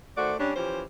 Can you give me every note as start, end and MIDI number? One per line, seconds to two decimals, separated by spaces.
0.18 0.34 51
0.18 0.34 57
0.18 0.34 66
0.18 0.34 72
0.18 0.34 74
0.40 0.52 55
0.40 0.52 61
0.40 0.52 62
0.56 0.83 52
0.56 0.83 53
0.56 0.83 61
0.56 0.83 67
0.56 0.83 72